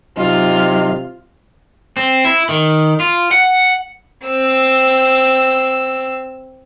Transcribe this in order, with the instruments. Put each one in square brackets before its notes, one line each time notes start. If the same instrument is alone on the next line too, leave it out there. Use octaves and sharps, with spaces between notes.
[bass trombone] C3 [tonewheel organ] F#3 D#4 D#5 [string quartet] F4 F6
[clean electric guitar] C4
E4
D#3
F4
F#5
[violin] C4 E6